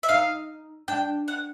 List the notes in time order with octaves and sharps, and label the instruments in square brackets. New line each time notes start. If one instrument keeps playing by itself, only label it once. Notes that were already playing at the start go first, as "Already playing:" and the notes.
[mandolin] E5
[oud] D#4 [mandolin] F5
[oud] D4 [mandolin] G5
[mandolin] F#5